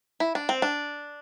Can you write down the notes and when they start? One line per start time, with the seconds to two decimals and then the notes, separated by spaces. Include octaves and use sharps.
0.20 E4
0.35 D4
0.49 C4
0.62 D4